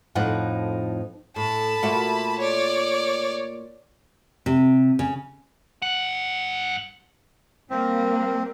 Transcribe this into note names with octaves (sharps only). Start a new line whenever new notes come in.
F2 A2 F3 D#4 A4 F#5
A2 A5 B5
A#2 A3 F#4
C#5 D5
C3
C#3
G2 F#5
G3 A#3 C4